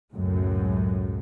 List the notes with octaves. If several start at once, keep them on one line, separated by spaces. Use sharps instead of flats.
C#2 F#2 A2 G#3